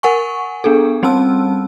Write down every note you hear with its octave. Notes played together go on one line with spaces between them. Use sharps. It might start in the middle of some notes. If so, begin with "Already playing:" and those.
A#4 F#5 G#5 C#6
B3 D4 G#4 A4
G3 C4 C#4 A5 E6